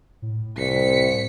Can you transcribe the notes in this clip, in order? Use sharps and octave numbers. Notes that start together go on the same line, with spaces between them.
A2
C2 B6 C#7